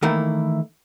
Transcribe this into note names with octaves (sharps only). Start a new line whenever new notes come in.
D#3 E3 A3 A#3 E4